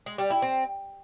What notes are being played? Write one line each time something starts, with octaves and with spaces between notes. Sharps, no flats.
G#3
G3
E4
C4